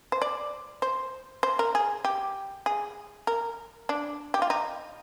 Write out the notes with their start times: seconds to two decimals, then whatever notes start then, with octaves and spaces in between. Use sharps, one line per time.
0.12 C5
0.22 D5
0.82 C5
1.43 C5
1.59 A#4
1.75 G#4
2.05 G4
2.66 G#4
3.27 A#4
3.89 D4
4.34 G4
4.42 F4
4.50 D#4